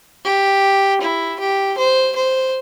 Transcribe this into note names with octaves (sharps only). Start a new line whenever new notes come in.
G4
E4
G4
C5
C5